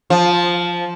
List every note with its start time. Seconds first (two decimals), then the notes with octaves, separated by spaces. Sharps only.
0.10 F3